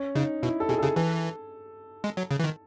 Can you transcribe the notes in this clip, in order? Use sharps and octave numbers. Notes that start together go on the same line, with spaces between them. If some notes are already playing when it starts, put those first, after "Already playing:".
Already playing: C#4
C#3 D#4
B2 E4
A4
B2 G#4
A4
C#3 G#4
E3 A4
G#3
F#3
C#3
E3
D#3